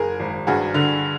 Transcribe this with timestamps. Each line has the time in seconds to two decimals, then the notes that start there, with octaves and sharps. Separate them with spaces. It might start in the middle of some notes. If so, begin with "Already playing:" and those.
Already playing: F#1 G#4 A#4
0.20 G#1
0.47 G2 F#4 G#4
0.74 D3